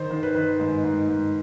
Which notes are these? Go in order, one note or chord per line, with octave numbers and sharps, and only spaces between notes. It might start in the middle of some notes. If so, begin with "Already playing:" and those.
Already playing: D#3 C5
D#3
B4
D#3
G#2
G#2
G#2